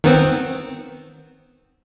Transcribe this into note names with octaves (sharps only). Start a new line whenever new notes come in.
D#3 B3 C4